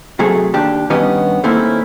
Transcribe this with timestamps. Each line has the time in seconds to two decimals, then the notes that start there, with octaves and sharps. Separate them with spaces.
0.19 C3 F#3 A3 G#4
0.54 D#2 D4 G4
0.90 G2 D#3 B3 C#4 G4 D#5
1.44 D#3 A3 A#3 C4 C#4 E4